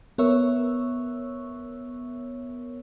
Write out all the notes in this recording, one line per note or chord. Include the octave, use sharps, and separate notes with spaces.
B3 A#4 C#5 E5 C#6 E6